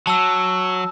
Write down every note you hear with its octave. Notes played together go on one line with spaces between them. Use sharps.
F#3 A5 E6